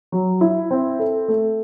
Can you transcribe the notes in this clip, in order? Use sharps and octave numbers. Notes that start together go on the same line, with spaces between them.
F#3
E4
C4
A4
A3